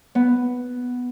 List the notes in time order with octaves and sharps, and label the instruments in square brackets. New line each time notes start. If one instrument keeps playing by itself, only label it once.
[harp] B3